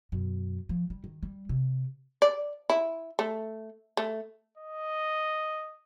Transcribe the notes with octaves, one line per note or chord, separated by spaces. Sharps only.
F#2 B2
F3
G3
D#3
G3
C3
D5
E4
A3
A3
D#5